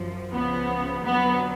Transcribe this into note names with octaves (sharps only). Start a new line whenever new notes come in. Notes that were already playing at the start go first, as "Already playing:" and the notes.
Already playing: F#2 F3
C#2 C#3 F3 B3
F2 D3 F#3 B3